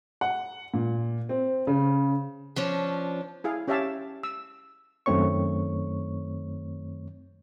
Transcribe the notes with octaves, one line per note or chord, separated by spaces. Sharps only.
F#5
A#2
C4
C#3
F3 C#4 D4
E4 G#4 F5
C#4 G4 C#5 E5 F5 A5
E6
F#2 D#3 A3 C4 C#5 C#6